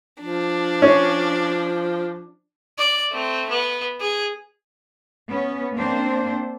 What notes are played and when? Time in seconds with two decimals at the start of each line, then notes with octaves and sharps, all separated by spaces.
0.22 F3 D4
0.82 C#4
2.78 D5
3.11 A3 C4
3.50 B3
4.01 G#4
5.29 B3 C#4
5.76 A#3 C4 D4 C5